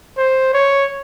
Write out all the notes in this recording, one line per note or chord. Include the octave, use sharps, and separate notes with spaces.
C5
C#5